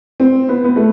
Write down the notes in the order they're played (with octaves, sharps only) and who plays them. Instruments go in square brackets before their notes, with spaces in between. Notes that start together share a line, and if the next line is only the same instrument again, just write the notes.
[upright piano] C4
B3
B3
A3